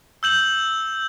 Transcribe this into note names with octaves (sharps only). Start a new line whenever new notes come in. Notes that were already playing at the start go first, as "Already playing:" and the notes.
E6 G6 F#7